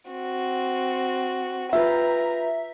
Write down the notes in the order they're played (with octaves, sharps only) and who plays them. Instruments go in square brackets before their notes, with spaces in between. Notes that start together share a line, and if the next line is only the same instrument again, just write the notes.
[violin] C4 F#4
[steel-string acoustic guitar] F4 G4 B4 [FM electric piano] E5 [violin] A#5